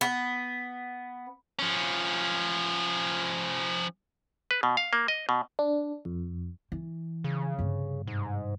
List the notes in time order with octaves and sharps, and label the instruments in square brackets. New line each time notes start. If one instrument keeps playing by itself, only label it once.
[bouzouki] B3
[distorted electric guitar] F3 C#4
[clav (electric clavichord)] B4
B2
F5
A#3
D#5
B2
[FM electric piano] D4
F2
[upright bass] E3
[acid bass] C#3
[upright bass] G2 C3
[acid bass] G#2